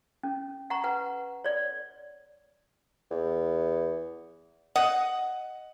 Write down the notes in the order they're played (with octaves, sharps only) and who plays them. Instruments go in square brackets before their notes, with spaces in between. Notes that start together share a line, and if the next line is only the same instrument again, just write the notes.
[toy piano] C#4
F#5 A#5 C#6
B4 F#5
C#5 D5
[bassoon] E2
[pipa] D#5 F#5